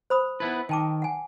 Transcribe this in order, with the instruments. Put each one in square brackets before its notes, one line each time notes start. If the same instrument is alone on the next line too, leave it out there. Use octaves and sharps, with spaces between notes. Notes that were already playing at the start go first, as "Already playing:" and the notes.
[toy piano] C5 B5 D#6
[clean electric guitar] B3 E4 B4 [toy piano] D#4
[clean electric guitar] D#3 [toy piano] G5 A5 D6
[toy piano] F#5 G#5